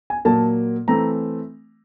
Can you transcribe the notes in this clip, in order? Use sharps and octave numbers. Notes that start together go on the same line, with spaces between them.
G#5
A#2 F#3 A#3 A5
E3 A3 C4 A#5